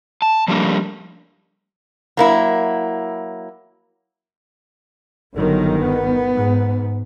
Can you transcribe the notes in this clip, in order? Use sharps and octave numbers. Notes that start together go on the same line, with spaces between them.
A5
F3 G3 A3 A#3 D4
F#3 A#3 E4
G1 D3 D#3 F#3
B3
G#2